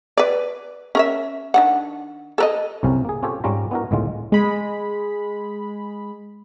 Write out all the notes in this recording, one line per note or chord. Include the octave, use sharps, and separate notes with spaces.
B4 D5
C#4 A#4 E5
D#3 D4 F#5
A4 A#4 D#5
C2 F#2 C3 C#4 A#4 F5
A#3 G#4
C#4 F4 G4 A4 C5 C#5
G#2 G3 C#4 F4 A#5
B3 D4 E4 F#4 A#4
G1 C#2 A2 D#3 G#3 F4
G#3 B5